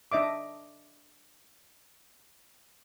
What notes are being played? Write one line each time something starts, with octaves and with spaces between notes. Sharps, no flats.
D4 D#5 E5 D6